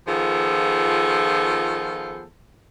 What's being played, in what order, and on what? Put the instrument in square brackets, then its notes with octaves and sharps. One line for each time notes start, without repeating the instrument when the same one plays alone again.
[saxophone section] D#3 F3 B3 F4 G#4 A4